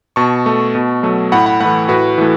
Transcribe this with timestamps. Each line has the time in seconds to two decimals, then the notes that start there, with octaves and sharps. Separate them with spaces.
0.16 B2 A5 C#6
0.46 A3
0.75 B2
1.03 F#3 A3
1.32 A2 F#5 B5
1.46 F#5 B5
1.60 E3 A3 F#5 B5
1.88 A2 F#4 B4
2.18 E3 A3